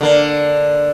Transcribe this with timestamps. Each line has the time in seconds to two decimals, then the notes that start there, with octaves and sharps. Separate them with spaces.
0.01 D3 A#3